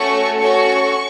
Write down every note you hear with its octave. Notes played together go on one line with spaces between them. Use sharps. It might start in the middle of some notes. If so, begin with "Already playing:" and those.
Already playing: A3 C#4 F#4 A4 C#6
C#4 F#4 A4 C#6